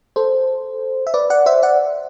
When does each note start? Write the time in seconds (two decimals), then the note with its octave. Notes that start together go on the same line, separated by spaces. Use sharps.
0.16 A4 C5
1.07 E5
1.14 B4 D5
1.30 D5 F#5
1.46 C5 E5
1.62 D5 F#5